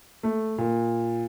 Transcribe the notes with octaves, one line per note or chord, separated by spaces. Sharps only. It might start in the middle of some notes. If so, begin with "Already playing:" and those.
A3
A#2